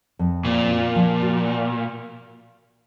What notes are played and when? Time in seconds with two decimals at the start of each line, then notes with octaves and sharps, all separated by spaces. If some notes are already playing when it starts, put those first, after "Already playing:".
0.19 F2
0.45 A#2 C4
0.71 F4
0.96 F3
1.22 F#4